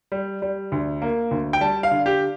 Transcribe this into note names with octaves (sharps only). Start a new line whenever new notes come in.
G3
G3
D2
A#3
D2
G5
G3 A5
F5
D3
G4